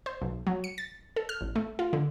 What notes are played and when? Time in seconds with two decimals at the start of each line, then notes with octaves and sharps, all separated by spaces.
0.06 C5
0.22 B1
0.47 F#3
0.64 C#7
0.78 A6
1.16 A4
1.29 F6
1.41 A1
1.56 A3
1.79 F4
1.93 D3